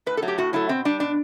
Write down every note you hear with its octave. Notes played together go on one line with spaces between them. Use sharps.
A2 B4
A4
F#3 A3
G4
A2 F#4
F#3 A3 E4
B2 C4
G3 D4
B2 D4